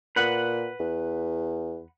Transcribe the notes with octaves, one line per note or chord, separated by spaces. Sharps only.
A#2 B4 F#5
E2